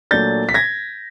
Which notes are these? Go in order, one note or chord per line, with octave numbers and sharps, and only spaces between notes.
A#2 F#3 A3 D4 G6 A6
B6
G#6 A#6